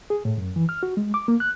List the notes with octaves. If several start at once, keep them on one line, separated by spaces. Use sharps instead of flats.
G#4
A2
F#2
E3
F6
F#4
G#3
D6
A#3
F#6